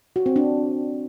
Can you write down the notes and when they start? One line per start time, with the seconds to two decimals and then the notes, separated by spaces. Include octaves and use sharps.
0.16 F#4
0.26 C4
0.36 D4